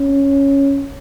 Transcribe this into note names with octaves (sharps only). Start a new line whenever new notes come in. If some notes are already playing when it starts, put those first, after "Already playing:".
Already playing: C#4